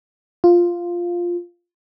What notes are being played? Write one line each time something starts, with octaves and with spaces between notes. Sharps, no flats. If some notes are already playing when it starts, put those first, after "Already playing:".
F4